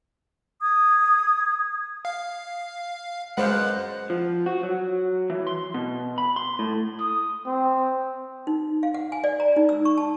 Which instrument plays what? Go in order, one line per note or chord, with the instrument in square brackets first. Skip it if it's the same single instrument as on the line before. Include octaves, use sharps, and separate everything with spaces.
[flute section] D#6 G#6
[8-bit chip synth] F5
[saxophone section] F#2 F#5 [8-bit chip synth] G#3 [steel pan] B4 C5 F5
[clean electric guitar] F3
F#4
F#3
E3
C6
B2
B5
C6
A2
[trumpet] D#6
C4
[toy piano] D#4
F5
F#5
G#5
D5
A#5
D#4
E6
C#6
A5